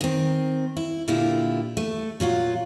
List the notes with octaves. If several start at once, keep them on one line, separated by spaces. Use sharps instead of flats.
D#3 C4
E4
A#2 D3 A#3 E4 F4 G4
A3
A#2 F#3 F4 F#4